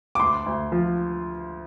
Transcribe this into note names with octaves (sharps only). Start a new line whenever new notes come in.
D6
D2 C6
D2
F3